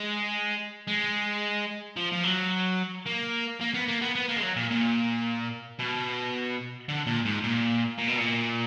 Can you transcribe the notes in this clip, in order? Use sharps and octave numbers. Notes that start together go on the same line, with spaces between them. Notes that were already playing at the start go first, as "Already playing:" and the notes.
Already playing: G#3
G#3
F3
F3
F#3
A#3
A#3
B3
A#3
B3
B3
A#3
G#3
F#3
A#2
A#2
B2
D3
A#2
G#2
A#2
A#2
B2
A#2